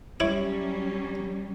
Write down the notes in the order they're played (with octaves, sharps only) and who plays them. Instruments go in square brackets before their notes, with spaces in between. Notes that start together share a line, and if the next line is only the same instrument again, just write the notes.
[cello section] F#3 G3 C#4 [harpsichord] E4 C#5 D6